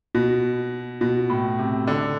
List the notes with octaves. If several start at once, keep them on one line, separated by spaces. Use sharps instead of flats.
B2
B2
A2
C3
D3